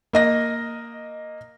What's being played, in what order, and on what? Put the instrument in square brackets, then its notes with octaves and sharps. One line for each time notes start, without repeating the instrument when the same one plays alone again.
[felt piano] A#3 D#5 A#6